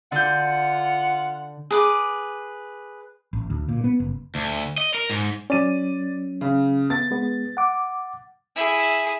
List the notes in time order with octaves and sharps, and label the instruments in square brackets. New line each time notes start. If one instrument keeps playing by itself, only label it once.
[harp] D3 G6 [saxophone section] F4 F#5
[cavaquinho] G#4 B4 D6
[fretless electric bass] A1
D2
A#2
B3
F#1
[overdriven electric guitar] D2
D#5
A#4
G#2
[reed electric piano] F#3 C#4 [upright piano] D5 D#7
[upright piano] C#3
[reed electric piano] B3 [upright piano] A6
[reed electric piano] G#3 B3
F#5 D6
[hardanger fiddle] E4 G#4